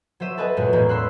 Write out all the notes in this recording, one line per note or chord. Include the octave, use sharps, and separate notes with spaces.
F#3 C5 E5 D#7
A4 B4 D#5 G#5
F#2 A#2 G#3
E2 A2 G#3 A#3 C#4
B5 C6 E6 F#6